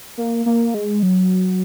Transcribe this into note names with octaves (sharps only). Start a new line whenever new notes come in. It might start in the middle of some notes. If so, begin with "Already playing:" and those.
A#3
A#3
G#3
F#3